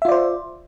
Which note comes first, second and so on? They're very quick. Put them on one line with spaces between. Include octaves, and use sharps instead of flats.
E5 F4 D5 C5